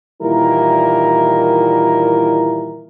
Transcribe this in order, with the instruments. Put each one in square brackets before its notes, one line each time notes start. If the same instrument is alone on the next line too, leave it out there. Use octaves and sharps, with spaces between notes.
[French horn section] A#2 D#3 E3 G3 E4 A#4